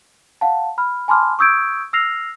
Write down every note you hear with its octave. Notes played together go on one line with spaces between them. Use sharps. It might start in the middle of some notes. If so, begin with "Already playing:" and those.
F5 F#5 A5
B5 F6
G#5 A5 B5 C6 D6 F6
C#6 D#6 E6 G6 G#6 D7
E6 F6 A#6 C7 F7